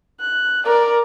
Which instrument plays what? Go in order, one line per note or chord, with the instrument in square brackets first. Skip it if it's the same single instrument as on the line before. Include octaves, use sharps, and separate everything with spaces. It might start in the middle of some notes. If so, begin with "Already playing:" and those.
[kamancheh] F#6
A#4 D5